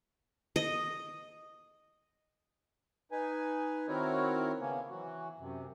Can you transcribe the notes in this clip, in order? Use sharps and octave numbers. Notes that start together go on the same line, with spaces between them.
D#5
D#4 B4 G#5
D#3 C4 E4 F#4 A#4 C#5
C#3 A#3 B3 C#4
E3 F#3 F#4
F#2 C3